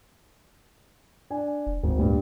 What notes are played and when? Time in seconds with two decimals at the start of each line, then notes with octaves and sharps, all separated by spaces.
1.30 D4 G#5
1.66 F1
1.83 G#1 D2
1.98 G2 A#2 G3